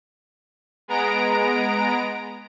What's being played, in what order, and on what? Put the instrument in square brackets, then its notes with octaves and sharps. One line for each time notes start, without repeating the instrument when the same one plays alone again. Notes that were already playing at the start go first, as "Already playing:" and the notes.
[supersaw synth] G#3 B3 A#5 D7